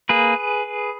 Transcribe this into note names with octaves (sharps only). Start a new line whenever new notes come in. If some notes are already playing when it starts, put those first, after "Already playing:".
A#3 G#4 B4